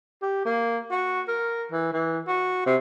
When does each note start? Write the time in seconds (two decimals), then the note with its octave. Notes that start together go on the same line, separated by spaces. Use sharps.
0.22 G4
0.45 A#3
0.91 F#4
1.28 A#4
1.72 E3
1.93 E3
2.28 F#4
2.66 C3